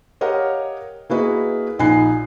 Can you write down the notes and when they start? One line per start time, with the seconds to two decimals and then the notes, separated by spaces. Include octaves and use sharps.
0.21 G4 A#4 C#5 D#5 F5 F#5
1.10 A#3 E4 F#4 G#4 B4 D#5
1.79 A#1 D#4 G#5 B5 F#6 C7